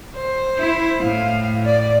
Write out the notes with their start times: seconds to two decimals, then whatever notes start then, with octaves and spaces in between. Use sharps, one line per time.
0.16 C5
0.58 E4
1.03 A2 F5
1.66 D5